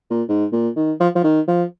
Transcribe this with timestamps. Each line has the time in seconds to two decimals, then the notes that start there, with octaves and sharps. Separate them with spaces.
0.10 A#2
0.29 G#2
0.52 A#2
0.76 D#3
1.00 F3
1.15 F3
1.24 D#3
1.48 F3